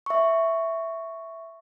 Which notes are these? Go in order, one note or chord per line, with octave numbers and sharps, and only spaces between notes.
E5 C#6